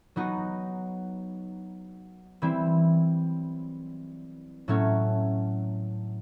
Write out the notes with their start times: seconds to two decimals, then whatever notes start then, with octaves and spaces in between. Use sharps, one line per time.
0.16 F#3 B3 D#4 F#4
2.42 E3 G3 C4 E4
4.68 A2 F#3 A3 C#4